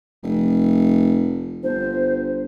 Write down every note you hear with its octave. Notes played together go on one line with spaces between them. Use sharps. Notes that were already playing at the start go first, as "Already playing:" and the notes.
F1
G1 C5